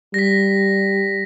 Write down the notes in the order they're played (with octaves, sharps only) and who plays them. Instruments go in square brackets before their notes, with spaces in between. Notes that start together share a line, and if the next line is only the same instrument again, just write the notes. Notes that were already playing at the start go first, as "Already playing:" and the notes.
[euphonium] G3 [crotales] A#6 B6